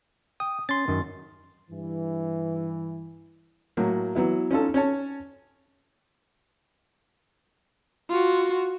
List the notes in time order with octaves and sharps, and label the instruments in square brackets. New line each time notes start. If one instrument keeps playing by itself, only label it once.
[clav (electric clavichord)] G5 [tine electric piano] D#6
[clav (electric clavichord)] C#4 [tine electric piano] C6 A6
[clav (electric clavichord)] F#2 D#3
[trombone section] G2 E3
[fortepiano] A2 F#3 A#3
E3 F#3 B3 E4
C#4 D#4 F4 A4
C#4 C#5 A5
[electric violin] F4 F#4